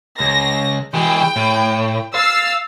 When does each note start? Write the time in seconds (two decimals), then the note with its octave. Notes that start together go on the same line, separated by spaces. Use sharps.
0.20 C#2 A#6
0.94 E3 G#3 G5
1.36 A2
2.15 F5 E6 A6 C7